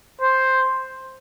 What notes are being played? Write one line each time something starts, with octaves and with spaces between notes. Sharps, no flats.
C5